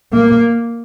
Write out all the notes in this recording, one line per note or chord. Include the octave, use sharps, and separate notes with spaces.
A#3